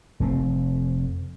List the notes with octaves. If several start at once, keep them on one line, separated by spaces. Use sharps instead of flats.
F1 A3 C4